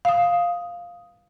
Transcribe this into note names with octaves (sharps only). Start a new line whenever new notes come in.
F5 D#6